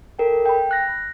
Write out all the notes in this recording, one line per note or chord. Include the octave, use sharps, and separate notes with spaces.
A4 A#4 G5
G5 B5
F#6 A#6